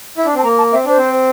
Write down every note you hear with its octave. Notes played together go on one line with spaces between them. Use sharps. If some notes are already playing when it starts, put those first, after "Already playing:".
E4
D4
C4
A5
A#3 A#5
A5
C4 E5
D4 C5
C4